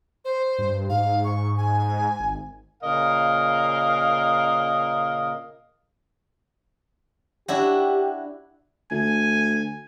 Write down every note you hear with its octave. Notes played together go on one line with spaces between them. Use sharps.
C5
G2
G#2 F5
C#6
G#5
G#1
A#2 C#3 A#4 D#5 F5
D4 E4 F#4 G4
D2 G#5